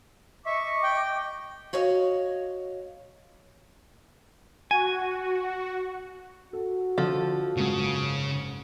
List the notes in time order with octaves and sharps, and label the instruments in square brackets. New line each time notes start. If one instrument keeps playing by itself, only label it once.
[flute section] D#5 D6 [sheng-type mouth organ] E5 [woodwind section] C#6
[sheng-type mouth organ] G5
[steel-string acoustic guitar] F#4 C#5 D#5 F5
[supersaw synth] F#4 [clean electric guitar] G#5
[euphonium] F#4 [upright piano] A4
[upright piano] D3 [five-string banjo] F3 A4
[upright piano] F#1 G#2 [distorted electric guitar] C#3